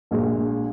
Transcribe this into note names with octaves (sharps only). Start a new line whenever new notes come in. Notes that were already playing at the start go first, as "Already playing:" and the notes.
A#1 A#2 G#3